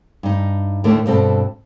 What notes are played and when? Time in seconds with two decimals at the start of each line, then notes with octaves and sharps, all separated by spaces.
0.23 G2 D#4
0.84 D#2 A2 D3 A3 A#3
1.06 G2 B2 C4 A4